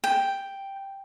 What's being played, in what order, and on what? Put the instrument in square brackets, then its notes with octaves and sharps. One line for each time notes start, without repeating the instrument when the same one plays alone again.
[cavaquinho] G5